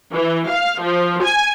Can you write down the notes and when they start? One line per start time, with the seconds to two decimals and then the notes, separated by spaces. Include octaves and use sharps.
0.12 E3
0.48 F5
0.81 F3
1.22 G#5